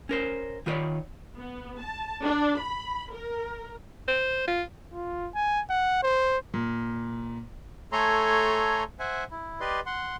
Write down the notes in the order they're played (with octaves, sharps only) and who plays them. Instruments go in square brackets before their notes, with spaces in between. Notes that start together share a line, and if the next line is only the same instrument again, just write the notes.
[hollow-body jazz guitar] C#4 A#4 C5
D#3 F4 B4 C#5 D5 B5
[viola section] B3
A5
D4
B5
A#4
[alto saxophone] C5
F4
[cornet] F4
G#5
F#5
C5
[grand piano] A#2
[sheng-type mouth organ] A3 A4 C#5 G#5 A#5 C6
C5 E5 F#5 G#5
E4
G4 B4 D5 D#5 C6
F#5 C6